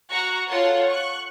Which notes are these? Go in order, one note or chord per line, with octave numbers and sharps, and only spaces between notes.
F#4 A#5 C#6 F#6
F4 A4 C#5 F#5 C6
C#6 F#6